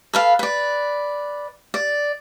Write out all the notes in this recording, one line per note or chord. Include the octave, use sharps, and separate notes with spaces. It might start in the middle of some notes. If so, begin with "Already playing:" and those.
A4 B4 F5
B4 D5
D5